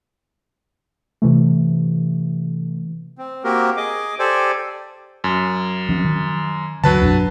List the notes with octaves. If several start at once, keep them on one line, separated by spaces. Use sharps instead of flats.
C3 E3 A3
C4
A#3 C4 F#4 G4 A#4
G#4 D#5 D6
G4 A4 C5 D5 G#5
F#2
F3 C4 C#4
D#3
D2 G2 D3 F#3 B4 A5
B1 F#2 D4